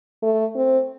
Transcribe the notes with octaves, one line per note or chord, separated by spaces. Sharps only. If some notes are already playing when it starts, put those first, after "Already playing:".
A3
C4